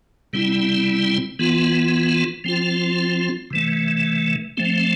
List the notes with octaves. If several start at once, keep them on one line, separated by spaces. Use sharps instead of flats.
C3 G3 C4 E4
E3 B3 F4
F3 C4 F4
C3 E3 A3
F3 A3 C4